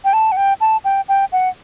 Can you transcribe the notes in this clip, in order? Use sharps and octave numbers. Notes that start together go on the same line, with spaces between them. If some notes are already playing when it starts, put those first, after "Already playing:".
G5
A5
F#5
G5
A5
G5
G5
F#5